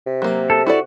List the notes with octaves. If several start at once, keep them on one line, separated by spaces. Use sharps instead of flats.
C3
F#3 A#3
A4
E4 F#4 A4 D5